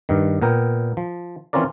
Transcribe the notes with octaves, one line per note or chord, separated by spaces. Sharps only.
G2 D#3
A#2 B3 A#4 G5
F3
E3 C4 C#4 F4 A#4 D5